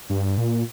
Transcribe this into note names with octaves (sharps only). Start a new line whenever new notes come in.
G2
A#2